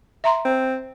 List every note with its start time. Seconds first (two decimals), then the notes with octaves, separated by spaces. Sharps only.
0.24 E5 A#5 C6
0.45 C4